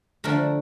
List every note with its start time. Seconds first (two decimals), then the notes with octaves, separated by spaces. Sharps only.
0.24 D3 F3 A3 A#4 A#5